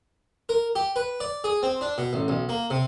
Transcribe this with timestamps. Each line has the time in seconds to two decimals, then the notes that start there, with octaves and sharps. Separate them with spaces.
0.49 A#4
0.75 G4
0.96 B4
1.20 D5
1.44 G#4
1.63 C4
1.81 D4
1.98 B2
2.13 A1
2.28 B1
2.49 A#3
2.70 C3